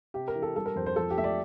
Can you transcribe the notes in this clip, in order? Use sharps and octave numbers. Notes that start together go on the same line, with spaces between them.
C3 G4
A#4
E3
A4
G3 A4
A#4
F2 C5
C5
F3 A4
G4
A3 E5
D5